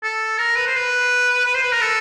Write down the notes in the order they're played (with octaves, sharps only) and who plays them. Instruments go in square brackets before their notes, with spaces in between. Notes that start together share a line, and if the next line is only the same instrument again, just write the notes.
[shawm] A4
A#4
B4
C5
B4
B4
C5
B4
A#4
A4